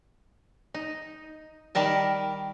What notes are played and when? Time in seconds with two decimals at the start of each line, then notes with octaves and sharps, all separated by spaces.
0.74 D#4
1.75 D#3 G3 A#4 A5